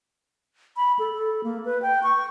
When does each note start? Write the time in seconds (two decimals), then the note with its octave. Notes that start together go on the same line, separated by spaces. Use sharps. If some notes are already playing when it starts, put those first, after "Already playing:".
0.77 B5
0.99 A4
1.13 A4
1.44 A#3
1.65 B4
1.82 G5
2.03 C#6